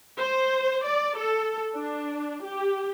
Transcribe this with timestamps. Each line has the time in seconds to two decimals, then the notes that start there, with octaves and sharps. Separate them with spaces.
0.19 C5
0.85 D5
1.19 A4
1.75 D4
2.45 G4